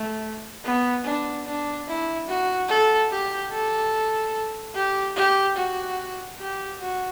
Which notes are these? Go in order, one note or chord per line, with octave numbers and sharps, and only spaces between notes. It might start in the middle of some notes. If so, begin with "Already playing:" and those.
Already playing: A3
B3
D4
D4
E4
F#4
A4
G4
A4
G4
G4
F#4
G4
F#4